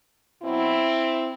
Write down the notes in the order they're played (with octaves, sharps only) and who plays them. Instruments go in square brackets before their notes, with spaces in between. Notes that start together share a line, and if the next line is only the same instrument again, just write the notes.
[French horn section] B2 F#3 B3 C4 E4